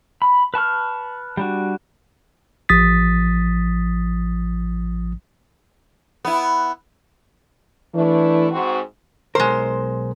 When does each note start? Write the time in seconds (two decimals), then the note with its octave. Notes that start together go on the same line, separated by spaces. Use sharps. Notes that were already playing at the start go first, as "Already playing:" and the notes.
0.22 B5
0.54 B4 A5 C#6 F6
1.37 G3 D4 F#4
2.69 A1 F3 D#6 A6 B6
6.25 B3 E4
7.95 E3 A3 D4 E4
8.51 G#2 C4 F#4
9.35 B1 G#3 A#4 C5